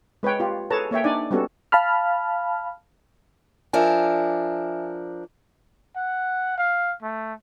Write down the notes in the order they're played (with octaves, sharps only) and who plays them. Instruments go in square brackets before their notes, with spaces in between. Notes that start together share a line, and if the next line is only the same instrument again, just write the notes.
[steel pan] G#3 B4 C#5 G5
F4 G4
G#4 A4 B4 C#5 A5 A#5
A#3 C#5 E5 G5
D4 D#4 D5 G#5
G3 B3 C#4 F#4 A4
[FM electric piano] F5 A5 B5 F6
[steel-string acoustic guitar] F3 D4 A#4 [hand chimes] E5 G#5
[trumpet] F#5
F5
A3